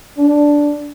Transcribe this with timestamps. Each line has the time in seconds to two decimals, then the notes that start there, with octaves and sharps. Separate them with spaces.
0.17 D4